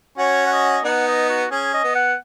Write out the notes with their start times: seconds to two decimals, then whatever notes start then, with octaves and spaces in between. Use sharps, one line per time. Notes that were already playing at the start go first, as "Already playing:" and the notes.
0.18 C#4 F#4 C#5
0.47 F#5
0.52 D#5
0.85 B3 D#4 F#5
1.08 D#5
1.29 F#4
1.51 C#4 G#4
1.74 D#5
1.84 B3
1.95 F#5